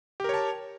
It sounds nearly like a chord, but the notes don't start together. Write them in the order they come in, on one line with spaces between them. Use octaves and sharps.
G4 A#4 C#5 A5